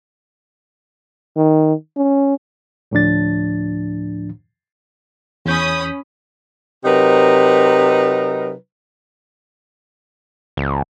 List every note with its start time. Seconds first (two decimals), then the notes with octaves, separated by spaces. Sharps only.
1.36 D#3
1.97 C#4
2.92 D2 A2 F3 D4 A6
5.45 E2 C#4 B5 D#6 G6
6.85 C3 F#3 D#4 A#4 B4
10.57 C#2